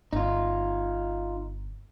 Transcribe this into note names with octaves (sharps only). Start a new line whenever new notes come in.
G1 D#4 F4